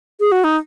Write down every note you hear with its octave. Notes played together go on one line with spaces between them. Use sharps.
G#4
F#4
D#4